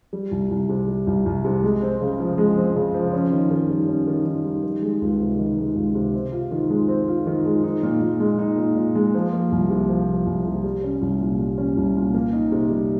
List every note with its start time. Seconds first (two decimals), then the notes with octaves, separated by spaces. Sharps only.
0.13 G3
0.31 C2
0.51 C2
0.69 C3
0.88 G3
1.07 C2
1.26 C2
1.45 C3
1.63 G#3
1.82 C4
2.01 C#3
2.19 F3
2.38 G#3
2.57 C4
2.76 C#3
2.94 F3
3.13 C#4
3.32 D#3
3.51 D#3
3.69 G3
3.88 C#4
4.08 D#3
4.26 D#3
4.45 G3
4.64 D#3
4.82 G#3
5.01 C#2
5.20 C3
5.39 D#3
5.57 G#3
5.76 C#2
5.95 C3
6.14 C4
6.32 F4
6.51 D#3
6.70 G#3
6.88 C4
7.08 F4
7.27 D#3
7.45 G#3
7.64 D#4
7.83 A#2
8.01 A#2
8.20 G#3
8.39 D#4
8.58 A#2
8.76 A#2
8.95 G#3
9.14 F3
9.33 A#3
9.52 C2
9.70 C3
9.89 F3
10.08 A#3
10.26 C2
10.45 C3
10.64 G3
10.83 C#4
11.01 C2
11.21 A#2
11.39 G3
11.58 C#4
11.77 C2
11.96 A#2
12.14 A#3
12.33 D#4
12.52 C3
12.70 G3